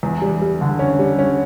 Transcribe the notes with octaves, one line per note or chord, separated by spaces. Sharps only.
E2
G3
G3
D3
C#4
G3
C#4